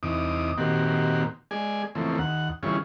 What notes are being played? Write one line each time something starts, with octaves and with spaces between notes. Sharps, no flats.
E2 C3 D#4 D6 D#6
A#2 D#3 A#3 C4 F#4 G4
G#3 G#4 D5 G#5
C#3 E3 F3 A3 A#3 C4
D#2 F#5
C#3 E3 G3 C#4 F4 G#4